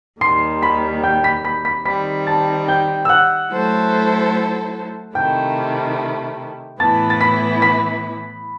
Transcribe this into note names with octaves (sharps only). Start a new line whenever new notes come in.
D#2 D#3 G3 C6 C7
B5 B6
G5 G6
B5 B6
B5 B6
B5 B6
D#3 G3 C4 B5 B6
A5 A6
G5 G6
E6
F#5 F#6
F#3 A3 E4 A4 C5
C3 D#3 A3 E4 G5 G6
A2 E3 B3 E4 B4 A5 A6
A6
B5 B6
B5 B6